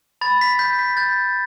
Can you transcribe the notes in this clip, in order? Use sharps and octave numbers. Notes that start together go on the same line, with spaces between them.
B5 A6
B6
G6 B6
B6
G6 A6